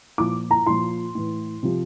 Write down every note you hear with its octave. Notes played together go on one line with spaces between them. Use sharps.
A#2 F3 D6
A#5
A#2 F3 C6
A2 E3
C3 F3